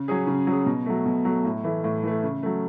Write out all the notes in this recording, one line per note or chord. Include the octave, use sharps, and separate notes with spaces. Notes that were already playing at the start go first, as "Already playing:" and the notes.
Already playing: C#3
F#3 C#4 G#4
C#3
F#3 C#4 G#4
B2
F#3 A3
B2
F#3 A3
A2
E3 A3
A2
E3 A3
C#3
F#3 A3